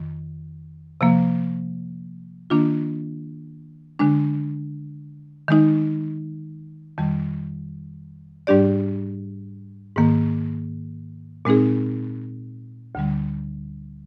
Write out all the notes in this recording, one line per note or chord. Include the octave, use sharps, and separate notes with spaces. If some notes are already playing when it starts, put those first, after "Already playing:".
Already playing: F2 D#3
C3 F3 A#3
D#3 A#3 D4 F4
D3 G#3 D4
D#3 G#3 D#4
F2 D#3 G3
G#2 G3 D4 G4 D5
G#2 D#3 A#3
A#2 G#3 C4 D#4 G#4
D2 D3 G3